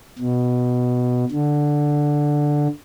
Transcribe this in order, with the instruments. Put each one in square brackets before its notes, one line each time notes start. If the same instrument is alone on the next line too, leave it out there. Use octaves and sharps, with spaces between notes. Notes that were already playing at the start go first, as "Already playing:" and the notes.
[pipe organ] B2
D3